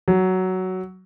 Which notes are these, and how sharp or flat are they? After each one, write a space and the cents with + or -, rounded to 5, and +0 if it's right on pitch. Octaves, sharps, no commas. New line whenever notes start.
F#3 +10